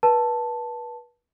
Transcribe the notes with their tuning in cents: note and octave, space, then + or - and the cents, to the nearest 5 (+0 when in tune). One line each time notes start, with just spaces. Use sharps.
B4 -30 A5 +0